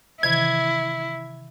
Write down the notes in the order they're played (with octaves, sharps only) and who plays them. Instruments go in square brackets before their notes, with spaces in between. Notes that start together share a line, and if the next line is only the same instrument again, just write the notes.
[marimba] C3 D#3 E3 [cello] E4 [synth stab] G#6